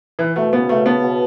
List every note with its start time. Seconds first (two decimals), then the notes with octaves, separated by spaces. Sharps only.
0.19 E3 E4
0.36 B2 A3
0.52 C#3 B3
0.69 C#3 A3
0.86 B3 A4
1.03 B2